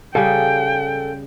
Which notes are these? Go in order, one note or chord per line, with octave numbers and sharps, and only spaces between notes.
C#3 G3 G#4 A4 F5 G5 G#5